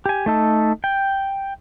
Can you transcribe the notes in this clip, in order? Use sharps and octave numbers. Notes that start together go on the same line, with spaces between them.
G4 G#5
A3 D#4 A4
G5